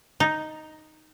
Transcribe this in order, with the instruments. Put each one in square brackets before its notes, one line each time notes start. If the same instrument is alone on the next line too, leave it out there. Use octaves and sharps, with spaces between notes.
[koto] D#4